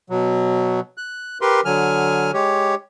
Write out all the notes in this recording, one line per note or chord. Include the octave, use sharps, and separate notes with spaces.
B2 F#3
F#6
G4 A#4 B4 C6
D3 F#3 G#5 F6
G#3 G4 C#5